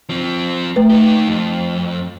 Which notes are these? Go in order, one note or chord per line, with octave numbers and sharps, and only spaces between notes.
F3 C4
A3 B4
D#4 G4
F2